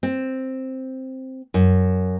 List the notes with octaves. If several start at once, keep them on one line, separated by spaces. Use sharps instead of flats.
C4
F#2